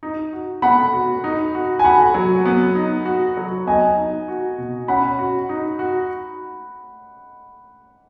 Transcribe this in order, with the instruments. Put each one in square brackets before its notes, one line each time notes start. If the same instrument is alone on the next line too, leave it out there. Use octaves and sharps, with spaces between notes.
[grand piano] D#4
F#4
[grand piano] B3 [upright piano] F#5 B5
[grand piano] F#4
D#4
F#4
[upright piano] G#5
[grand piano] F#4 [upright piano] F#5 B5
[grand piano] F#3
B3
D#4
F#4
F#3
[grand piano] B3 [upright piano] D#5 G#5
[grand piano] D#4
F#4
B2
[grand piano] C#4 [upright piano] F#5 B5
[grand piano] F#4
D#4
F#4